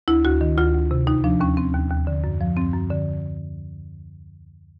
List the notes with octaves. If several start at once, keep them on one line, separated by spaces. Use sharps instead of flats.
D2 E4
D2 F#4
D#3
D2 F4
D2
C3
D#2 D#4
F3 D4
D#2 C#4
D#2 C4
D#2
D#2
D3
F#2
F3
F#2 C4
F#2
D3